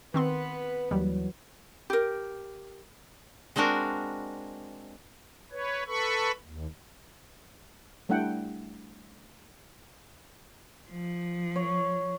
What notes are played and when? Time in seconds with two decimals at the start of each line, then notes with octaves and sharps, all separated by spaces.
0.14 D#3 B3 C4 B4 C6
0.91 D#2 E3 F#3 G3
1.90 G4 A#4
3.56 G#3 C4 D4 F#4 A#4
5.52 B4 C#5
5.87 A4 B4 B5 C#6
6.44 D#2
8.09 G3 A3 D4 E4 F#5 G5
10.89 F3
11.56 C#5